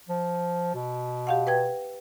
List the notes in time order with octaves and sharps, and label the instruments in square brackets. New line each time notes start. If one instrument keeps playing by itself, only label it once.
[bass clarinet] F3
B2
[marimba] G4 F5 F#5
B4 G5 G#6